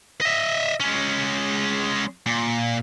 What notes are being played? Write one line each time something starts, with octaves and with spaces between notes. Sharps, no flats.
D#5 E5
G#3 C#4
A#2